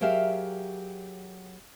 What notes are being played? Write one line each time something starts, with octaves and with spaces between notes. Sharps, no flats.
F#3 G4 G#4 A#4 E5 F5